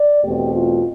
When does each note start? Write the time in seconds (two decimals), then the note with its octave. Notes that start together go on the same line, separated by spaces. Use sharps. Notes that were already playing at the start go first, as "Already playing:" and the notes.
Already playing: D5
0.23 E2 B2 A3 C4 G4
0.54 F4